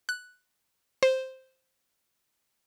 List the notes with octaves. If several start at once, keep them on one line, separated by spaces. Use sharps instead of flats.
F#6
C5